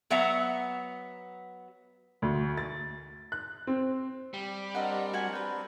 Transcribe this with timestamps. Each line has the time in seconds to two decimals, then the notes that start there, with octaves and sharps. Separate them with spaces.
0.10 F#3 B3 E5 F#5 A#5
2.22 D2
2.57 A6
3.32 F#6
3.67 C4
4.34 G3
4.75 C4 D4 A#4 D#5 F#5
5.13 F#4 F#5 G#5
5.33 B4 G5